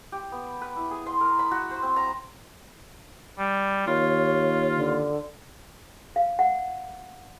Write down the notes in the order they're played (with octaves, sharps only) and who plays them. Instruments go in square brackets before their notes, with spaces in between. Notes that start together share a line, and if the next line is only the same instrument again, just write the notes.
[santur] G4
B3
B4
E4
G#4
C6
A#4
B5
F#4
C5
C4
A#5
[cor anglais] G3
[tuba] D#2 [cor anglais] F4 [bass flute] C#5
[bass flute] D3
[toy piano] F5
F#5